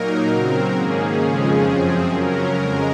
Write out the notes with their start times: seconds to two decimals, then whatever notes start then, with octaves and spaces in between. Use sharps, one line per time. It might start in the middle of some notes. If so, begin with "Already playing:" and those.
Already playing: A#2 F#3 A#3 D#4 A#4
0.31 C#3 F#3 C4
0.76 G#2 D#3 A#3 C#4 G#4
1.22 F2 C#3 F3 G#3 C#4
1.67 F#2 F3 C4
2.12 C#3 F#3 C#4 A#4
2.58 F2 C#3 G#3